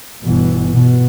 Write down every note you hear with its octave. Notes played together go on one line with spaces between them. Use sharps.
G1 B2 E3
B2